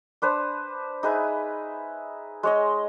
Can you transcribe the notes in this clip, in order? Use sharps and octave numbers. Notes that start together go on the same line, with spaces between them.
D4 B4 C5
D#4 G#4 B4 E5
G#3 C#5 D#5